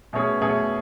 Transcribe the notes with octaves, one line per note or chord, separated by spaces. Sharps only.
B2 A3 C#4 G#4
B2 A3 C#4 G#4